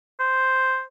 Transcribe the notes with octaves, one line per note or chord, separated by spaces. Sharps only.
C5